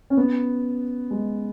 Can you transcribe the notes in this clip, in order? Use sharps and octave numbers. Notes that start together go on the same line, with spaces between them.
C#4
B3
G#3